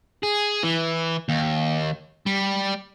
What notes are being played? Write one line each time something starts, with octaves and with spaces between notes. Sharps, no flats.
G#4
E3
D#2
G3